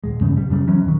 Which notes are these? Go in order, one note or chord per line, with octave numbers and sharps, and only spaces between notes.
D#1 G#3
E2 G2 C#3
B1 G3
F#2 C#3 G3
E3 F#3 C#4
D#1 D#3